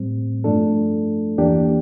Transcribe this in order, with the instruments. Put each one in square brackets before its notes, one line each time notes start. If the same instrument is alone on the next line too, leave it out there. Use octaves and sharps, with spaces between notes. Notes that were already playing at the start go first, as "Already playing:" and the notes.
Already playing: [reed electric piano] A2 G3 C4
G2 F3 A3 D4 A4
E2 E3 A#3 D4 G4